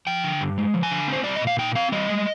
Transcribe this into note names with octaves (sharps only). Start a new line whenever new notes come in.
F3 G5
D3
G2
G#3
F3
G#5
D3
C4 C5
G3 D5
D#5
A#2
F5
D#4 G5
C4 F5
G3 D#5
G#3